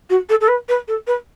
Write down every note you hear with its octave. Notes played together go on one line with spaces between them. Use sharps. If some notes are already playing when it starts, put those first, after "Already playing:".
F#4
A4
A4
B4
B4
A4
B4